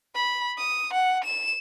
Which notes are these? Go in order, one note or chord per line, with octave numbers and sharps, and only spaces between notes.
B5
D#6
F#5
E7